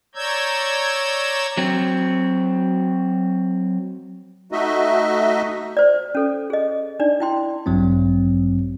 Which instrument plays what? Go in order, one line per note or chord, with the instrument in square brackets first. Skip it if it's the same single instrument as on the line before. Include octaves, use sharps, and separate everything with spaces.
[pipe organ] C#5 D5 A#5 E6 G6 G#6
[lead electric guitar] F#3 C4
[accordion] A3 D#4 F#4 D#5 E5
[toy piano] C5 D5
C#4 A4
G#4 D#5
D4 D#4 D5
E4 G5 C6
[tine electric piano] A1 G2 F#3 C4